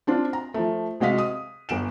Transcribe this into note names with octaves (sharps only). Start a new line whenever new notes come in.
C4 D4 F4
A#5
F3 A3
C3 G#3 F#4 D#5 F5 B6
D#6
G1 D7 E7